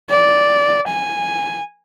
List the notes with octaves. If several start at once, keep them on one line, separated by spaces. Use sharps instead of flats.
D5
G#5